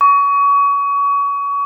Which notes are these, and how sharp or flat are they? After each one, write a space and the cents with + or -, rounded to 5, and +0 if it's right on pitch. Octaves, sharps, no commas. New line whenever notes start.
C#6 +30